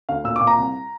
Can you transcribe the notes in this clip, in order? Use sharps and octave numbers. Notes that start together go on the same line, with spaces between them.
D2 F5
A#2 E6
A#2 D6
A#5
C2